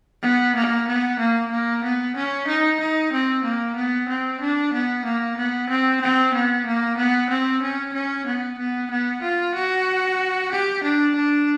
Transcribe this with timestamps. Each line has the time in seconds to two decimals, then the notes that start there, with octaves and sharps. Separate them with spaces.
0.23 B3
0.56 A#3
0.87 B3
1.19 A#3
1.51 A#3
1.84 B3
2.16 C#4
2.47 D#4
2.80 D#4
3.12 C4
3.44 A#3
3.76 B3
4.09 C4
4.41 D4
4.73 B3
5.05 A#3
5.37 B3
5.70 C4
6.01 C4
6.34 B3
6.66 A#3
6.98 B3
7.30 C4
7.62 C#4
7.94 C#4
8.26 B3
8.58 B3
8.91 B3
9.23 F4
9.55 F#4
10.52 G4
10.83 D4
11.16 D4